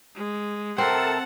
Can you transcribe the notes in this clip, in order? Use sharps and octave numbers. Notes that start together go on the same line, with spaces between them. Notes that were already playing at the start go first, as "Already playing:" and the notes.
G#3
C3 C4 A4 A#4 F#5 A5